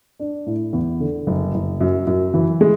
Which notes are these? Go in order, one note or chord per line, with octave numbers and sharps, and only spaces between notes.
D4
A2
E2
D3
F#1
F#1
F#2
F#2
E3
G#3